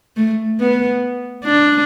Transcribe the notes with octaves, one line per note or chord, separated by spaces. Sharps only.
A3
B3
D4